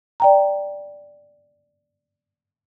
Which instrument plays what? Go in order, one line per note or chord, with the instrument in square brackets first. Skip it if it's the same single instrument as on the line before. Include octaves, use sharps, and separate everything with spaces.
[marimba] D5 G5 A#5